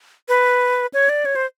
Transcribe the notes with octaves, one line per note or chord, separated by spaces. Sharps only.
B4
C#5
D5
C#5
C5